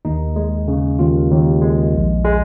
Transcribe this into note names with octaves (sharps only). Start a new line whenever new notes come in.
D#2 D#4
G#3
C#3
D#2 F4
D#2
G#3
A#1
G#3